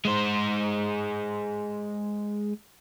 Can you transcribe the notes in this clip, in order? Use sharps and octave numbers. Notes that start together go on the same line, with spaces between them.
G#3 C5